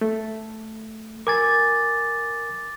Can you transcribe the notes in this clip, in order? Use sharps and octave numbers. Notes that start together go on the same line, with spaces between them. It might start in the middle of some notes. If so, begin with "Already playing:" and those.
A3
A#4 G#5 D6 A6